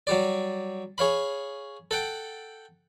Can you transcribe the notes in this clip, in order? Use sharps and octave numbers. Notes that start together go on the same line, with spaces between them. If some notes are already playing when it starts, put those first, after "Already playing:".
F#3 G3 D5
G#4 C#5 F5 B5
A4 F#5 G5